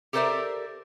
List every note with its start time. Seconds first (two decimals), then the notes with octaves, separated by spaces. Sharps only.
0.13 G4 A4 A#4 C5 D5 E5